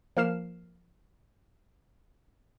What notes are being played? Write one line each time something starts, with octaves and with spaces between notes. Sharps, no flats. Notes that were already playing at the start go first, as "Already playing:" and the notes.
F3 A#3 A#4 F6 C7 E7